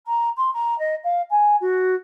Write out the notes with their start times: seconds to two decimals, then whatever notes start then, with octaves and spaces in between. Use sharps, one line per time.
0.06 A#5
0.37 C6
0.53 A#5
0.78 D#5
1.04 F5
1.30 G#5
1.60 F#4